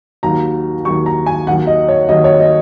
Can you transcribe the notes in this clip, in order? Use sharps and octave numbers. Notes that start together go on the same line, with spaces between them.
D#2 D#3 F#3 A#5
D#2 D#3 F#3 C#6
A#5
G#5
D#2 D#3 F#3 F#5
D#5
C#5
D#2 D#3 F#3 D#5
C#5
D#5